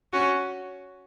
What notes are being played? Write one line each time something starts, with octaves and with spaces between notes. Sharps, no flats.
C#4 F#4